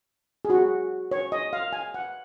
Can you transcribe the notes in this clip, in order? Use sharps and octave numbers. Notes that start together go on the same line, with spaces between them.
G#4
F#4
C#5
D#5
F5
G#5
F#5